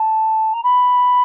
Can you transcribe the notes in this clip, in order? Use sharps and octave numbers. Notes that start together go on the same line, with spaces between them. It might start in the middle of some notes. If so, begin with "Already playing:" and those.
Already playing: A5
A#5
B5